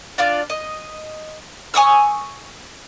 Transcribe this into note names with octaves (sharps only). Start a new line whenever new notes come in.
D4 F4 D5
D#5
G#5 C#6 D#6 E6